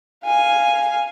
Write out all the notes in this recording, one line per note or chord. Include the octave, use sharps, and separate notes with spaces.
F5 G#5